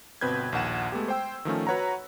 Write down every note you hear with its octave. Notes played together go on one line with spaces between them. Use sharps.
G1 B2 C4 B4 G6 G#6
A#1 D#2 F#5 E7
G#3 A3 B3 G4
C5 G5 E6
D#3 F3 A3 C#4
F#4 B4 C#5 F#5 A#5